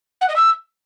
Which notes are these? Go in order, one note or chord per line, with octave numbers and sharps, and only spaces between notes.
F#5
D#5
E6